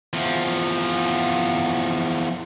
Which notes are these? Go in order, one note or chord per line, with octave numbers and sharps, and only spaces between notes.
E2 F3